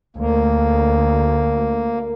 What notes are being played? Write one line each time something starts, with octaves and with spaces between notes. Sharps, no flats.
D2 A#3